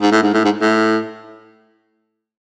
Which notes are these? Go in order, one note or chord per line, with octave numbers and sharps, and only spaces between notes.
G#2
A2
G#2
A2
G#2
A2